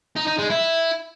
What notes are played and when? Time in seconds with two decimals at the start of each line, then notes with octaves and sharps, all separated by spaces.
0.16 D#4
0.28 D#4
0.39 G#3
0.50 E4